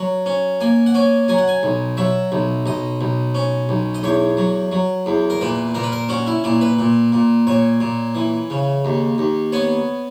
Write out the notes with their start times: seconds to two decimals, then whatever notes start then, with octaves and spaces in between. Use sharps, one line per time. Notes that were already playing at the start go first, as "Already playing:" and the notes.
Already playing: F#3
0.26 C#4
0.60 A#3 G#5
0.86 F#5
0.94 C#4 G#5
1.28 F#3 G#5
1.38 F#5
1.48 G#5
1.63 B1
1.97 F#3 E5
2.32 B1
2.66 B1 D#5
3.01 B1
3.35 C#4
3.69 B1
3.94 D#5
4.03 E2 C#5
4.37 F#3
4.72 F#3
5.06 E2
5.30 A#4
5.41 A#2 B4
5.75 A#2 A#4
5.83 B4
5.92 A#4
6.09 C#4 F#4
6.26 E4
6.44 A#2 E4
6.61 B4
6.79 A#2
7.12 A#2
7.47 A#2 C#5
7.81 A#2
8.15 E3
8.50 C#3
8.85 D#2
9.18 D#2
9.52 B3 C#5